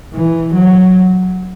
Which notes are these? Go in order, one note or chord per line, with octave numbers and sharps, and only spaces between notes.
E3
F#3